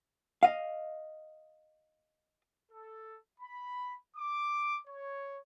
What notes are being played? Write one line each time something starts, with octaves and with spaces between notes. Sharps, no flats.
D#5 F5
A4
B5
D6
C#5